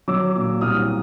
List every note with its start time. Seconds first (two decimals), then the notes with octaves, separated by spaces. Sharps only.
0.08 F#3 D6 E6
0.35 A#2
0.61 C2 D#6 F6